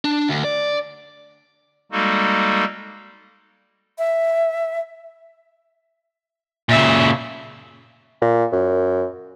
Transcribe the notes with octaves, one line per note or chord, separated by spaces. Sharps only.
D4
D2
D5
G3 G#3 A#3 D#4 F#4 A4
E5
A#2 C#3 E5
A#2
F#2